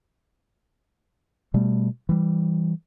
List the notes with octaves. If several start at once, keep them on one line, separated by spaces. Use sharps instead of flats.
B2 G3 A3
E3 G3